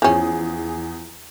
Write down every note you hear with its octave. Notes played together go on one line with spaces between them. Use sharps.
E2 F3 C#4 G#4